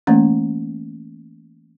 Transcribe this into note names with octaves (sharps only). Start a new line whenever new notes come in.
E3 A3 A#3 C#4